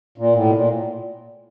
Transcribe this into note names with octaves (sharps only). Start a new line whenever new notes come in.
A#2
A2
B2
A#2